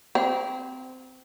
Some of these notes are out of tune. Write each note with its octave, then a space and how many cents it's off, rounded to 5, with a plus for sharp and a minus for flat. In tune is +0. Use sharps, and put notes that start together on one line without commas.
C4 -20